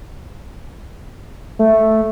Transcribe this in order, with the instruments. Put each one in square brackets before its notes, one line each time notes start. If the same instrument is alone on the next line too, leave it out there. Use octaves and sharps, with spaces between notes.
[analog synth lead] A3